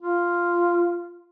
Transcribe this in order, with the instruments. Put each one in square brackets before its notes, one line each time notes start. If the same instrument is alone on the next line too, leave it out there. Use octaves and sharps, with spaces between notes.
[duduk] F4